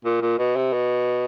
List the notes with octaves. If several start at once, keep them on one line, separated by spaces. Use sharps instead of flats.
A#2
A#2
B2
C3
B2